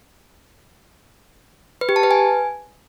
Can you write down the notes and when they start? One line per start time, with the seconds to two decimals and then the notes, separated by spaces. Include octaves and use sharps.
1.81 B4
1.89 G4
1.96 A5
2.03 B4
2.11 G#5